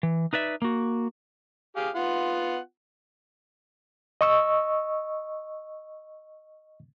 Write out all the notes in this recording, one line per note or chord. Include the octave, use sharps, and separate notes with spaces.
E3
D#4 B4 D5 E5
A#3 F#4
G4 G#4 F5
B3 F4 F#5
D#5 C#6 E6